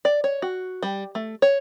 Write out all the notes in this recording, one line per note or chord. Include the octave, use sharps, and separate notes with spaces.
D5
C#5
F#4
G3
A3
C#5